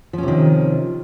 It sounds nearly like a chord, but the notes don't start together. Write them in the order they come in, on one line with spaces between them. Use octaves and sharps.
F3 C#4 C3 D#3